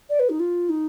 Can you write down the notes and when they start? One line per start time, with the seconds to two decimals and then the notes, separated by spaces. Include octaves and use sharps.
0.09 D5
0.19 B4
0.29 D#4
0.39 F4
0.69 D#4